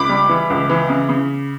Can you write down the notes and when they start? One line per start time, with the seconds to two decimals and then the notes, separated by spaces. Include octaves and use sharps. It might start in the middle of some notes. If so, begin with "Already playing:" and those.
Already playing: C#2 B5 D6
0.09 G3
0.29 E3
0.50 C#2
0.69 E3
0.89 C#3
1.09 C#3